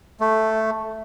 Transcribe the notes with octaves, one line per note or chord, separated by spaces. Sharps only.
A3